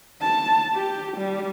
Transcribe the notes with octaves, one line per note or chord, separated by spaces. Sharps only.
A5
G4
G3